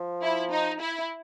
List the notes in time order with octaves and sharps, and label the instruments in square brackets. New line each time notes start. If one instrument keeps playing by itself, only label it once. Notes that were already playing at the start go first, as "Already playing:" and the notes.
Already playing: [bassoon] F3
[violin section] E4
D#4
E4